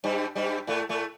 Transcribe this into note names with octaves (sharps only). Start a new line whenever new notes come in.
G2 G3
G2 G3
A2 A3
A2 A3